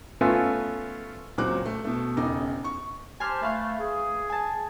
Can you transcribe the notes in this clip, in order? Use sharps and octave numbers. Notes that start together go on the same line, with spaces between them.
A3 B3 C#4 F4 E5 G#5
C#2 A#2 F#3 C4 D6 F#6
A3
B2 A3
E1 C#3 D#4 D6
C#6
G4 C5 G#5 A5 C6 F6
A3 B4 F5
G#4
G#5 A5